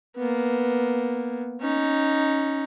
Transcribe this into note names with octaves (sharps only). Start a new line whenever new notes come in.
A#3 B3
C#4 D#4